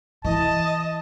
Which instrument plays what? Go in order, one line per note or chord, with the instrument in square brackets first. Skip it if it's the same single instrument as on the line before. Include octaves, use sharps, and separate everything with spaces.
[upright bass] E3 [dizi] D#5 [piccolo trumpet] A5